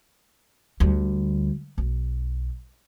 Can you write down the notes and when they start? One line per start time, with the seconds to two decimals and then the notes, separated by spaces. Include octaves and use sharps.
0.80 D2 G3
1.78 B1